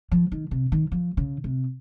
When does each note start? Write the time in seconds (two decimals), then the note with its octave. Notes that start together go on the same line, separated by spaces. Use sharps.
0.12 F3
0.32 D#3
0.51 C3
0.72 D#3
0.92 F3
1.17 C#3
1.44 C3